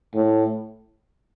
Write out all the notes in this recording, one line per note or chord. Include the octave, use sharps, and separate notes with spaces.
A2